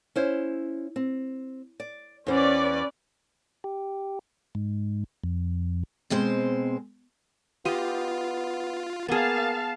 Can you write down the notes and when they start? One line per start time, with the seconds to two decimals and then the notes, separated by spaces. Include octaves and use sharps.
0.16 C#4 E4 C5
0.96 C4
1.80 D5
2.27 E2 C#4 B4 C5 D5
3.64 G4
4.55 G#2
5.24 F2
6.10 B2 G#3 C4 C5
7.65 B3 F4 G4 D#5
9.09 A#3 B3 G#4 F5 A5